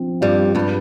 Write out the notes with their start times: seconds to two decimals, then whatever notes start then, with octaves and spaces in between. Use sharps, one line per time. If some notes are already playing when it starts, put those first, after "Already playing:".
Already playing: F3 C4 F4
0.21 G2 G3 F4
0.55 G2 G3 G#3